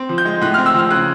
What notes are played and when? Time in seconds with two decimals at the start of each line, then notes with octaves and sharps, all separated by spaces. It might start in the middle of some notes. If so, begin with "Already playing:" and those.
Already playing: C4
0.09 F3
0.18 G6
0.25 G#3
0.42 A2 F#6
0.54 F6
0.58 C4
0.66 E6
0.75 F3 F6
0.90 C#3 F#6